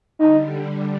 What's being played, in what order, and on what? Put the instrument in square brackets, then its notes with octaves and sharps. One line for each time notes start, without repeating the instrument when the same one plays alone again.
[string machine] D3 G3 [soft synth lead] D#4